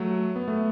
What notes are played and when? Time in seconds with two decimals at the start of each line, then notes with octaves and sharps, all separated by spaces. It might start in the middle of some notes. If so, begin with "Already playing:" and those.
Already playing: F#3 A3
0.36 B3
0.48 A3